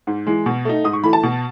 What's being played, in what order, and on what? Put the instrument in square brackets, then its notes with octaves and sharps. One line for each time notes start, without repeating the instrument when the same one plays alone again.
[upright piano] G#2
E3 G#3
B2
A3 D#4
G#2 D#6
C#6
E3 A3 B5
A5
B2